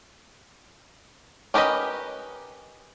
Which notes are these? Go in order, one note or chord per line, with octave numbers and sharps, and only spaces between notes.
C#4 G4 A#4 B4 D#5